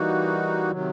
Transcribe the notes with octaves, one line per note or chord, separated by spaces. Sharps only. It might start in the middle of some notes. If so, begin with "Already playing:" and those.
Already playing: E3 G3 A#3 D#4 F#4
C3 D#3 F#3